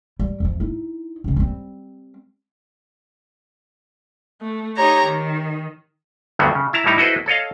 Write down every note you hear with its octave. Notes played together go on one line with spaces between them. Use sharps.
G3
F2 F3
D#4 E4
F#2 C#3
G3 C4
A3
D#4 G4 C#5 A#5
D#3
D2 G2 D3 F#3 G3 B3
C#3
E4 A5 A#5
A2 G3 D#4 E4 A#5
E4 F#4 A4 B4 C5 D#5
A4 C#5 D#5 F5